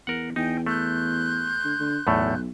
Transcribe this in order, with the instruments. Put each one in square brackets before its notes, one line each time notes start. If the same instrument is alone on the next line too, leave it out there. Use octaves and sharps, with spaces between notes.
[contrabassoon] E2 [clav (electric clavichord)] A#4 F#5
[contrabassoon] E2 [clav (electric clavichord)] D#4 [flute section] G5 G#5
[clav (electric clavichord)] A3 [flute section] C6 F#6 G6
[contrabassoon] D3
D3
[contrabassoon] B1 [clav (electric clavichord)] E2 A2 A3